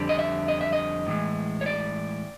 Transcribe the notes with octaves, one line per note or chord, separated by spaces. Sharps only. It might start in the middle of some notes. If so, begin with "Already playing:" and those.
Already playing: F2 D3 G3
D#5
E5
D#5
E5
D#5
A2 E3 G#3
C#5
D5